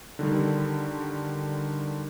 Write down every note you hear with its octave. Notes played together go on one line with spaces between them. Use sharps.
D3 D#3 G3